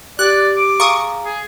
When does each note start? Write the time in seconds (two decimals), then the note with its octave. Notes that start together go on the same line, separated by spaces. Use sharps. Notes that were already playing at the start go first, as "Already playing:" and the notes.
0.19 G4 D5 F#6
0.56 D6
0.80 G#4 F5 A#5 C#6 D#6
1.25 G#4